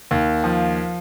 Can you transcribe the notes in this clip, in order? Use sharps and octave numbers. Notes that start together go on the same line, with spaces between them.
D#2
F3